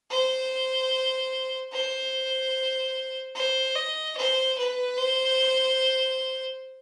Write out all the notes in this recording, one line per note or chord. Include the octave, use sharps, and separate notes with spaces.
C5
C5
C5
D#5
C5
B4
C5